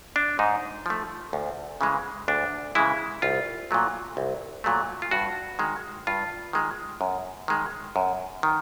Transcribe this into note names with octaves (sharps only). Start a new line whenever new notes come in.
D4
G#2 D#4
F3 A3
D2
C#3 E3 G#3
D2 D4
C#3 E3 G#3 E4
C2 F4
A#2 F#3 A3
C2
A#2 F#3 A3
F4
G2 F#4
D#3 G#3
G2 F4
D#3 G#3
F#2
D#3 G#3
F#2
D#3